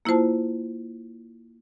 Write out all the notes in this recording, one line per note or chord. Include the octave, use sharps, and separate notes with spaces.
A#3 E4 F4 C5 A5